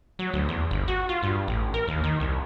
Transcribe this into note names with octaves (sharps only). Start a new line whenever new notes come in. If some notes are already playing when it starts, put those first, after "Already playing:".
F#3
D2
E2
G1
F#4
F4
G2
A1
A#4
D#2
D#3
C2